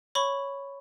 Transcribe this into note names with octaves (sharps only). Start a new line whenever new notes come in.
C#5 B5 C#6